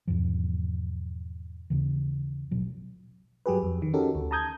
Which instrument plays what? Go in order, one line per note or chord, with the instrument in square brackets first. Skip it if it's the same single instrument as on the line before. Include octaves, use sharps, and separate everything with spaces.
[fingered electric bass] E2 G#2 B2 F3
D#2 C#3 E3
A1 B2 F#3
[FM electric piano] G2 F#3 G4 G#4 B4
F2
D#3
C#4 D#4 F#4 G4 A4 A#4
D2
A5 A#5 D#6 G6 G#6